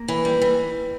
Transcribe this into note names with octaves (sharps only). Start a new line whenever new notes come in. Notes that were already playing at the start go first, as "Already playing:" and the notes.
Already playing: A#3
E3
G3
E3